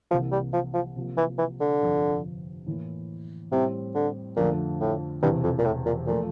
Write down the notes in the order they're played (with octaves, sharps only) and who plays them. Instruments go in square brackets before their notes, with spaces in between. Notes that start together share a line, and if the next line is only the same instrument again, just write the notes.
[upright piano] C2 C3 E3 A#3 [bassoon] F3
[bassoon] G3
F3
F3
[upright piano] C3 F3 A#3
[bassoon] E3
E3
D3
[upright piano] G1 F2 C3 F3
A2 E3 A#3
[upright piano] A2 G3 C4 G4 [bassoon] C3
[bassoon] D3
[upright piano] F2 D3 F3 A3 [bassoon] A#2
[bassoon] A2
[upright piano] E1 E2 C3 E3 [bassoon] G2
[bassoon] F2
A#2
A2
A#2
[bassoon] A#2 [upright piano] F3 A3